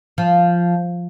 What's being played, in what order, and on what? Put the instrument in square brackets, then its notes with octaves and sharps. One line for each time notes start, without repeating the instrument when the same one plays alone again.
[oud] F3